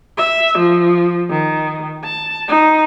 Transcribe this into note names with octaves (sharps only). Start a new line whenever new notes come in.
E5
F3
D#3
A5
D#4